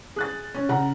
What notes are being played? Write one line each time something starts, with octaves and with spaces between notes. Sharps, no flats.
G#4 F#6 A6
C#4
C#3 F#5 A#5